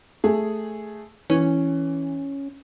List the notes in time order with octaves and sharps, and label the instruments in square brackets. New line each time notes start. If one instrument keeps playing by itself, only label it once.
[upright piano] A3 G#4
[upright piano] E3 [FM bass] C#4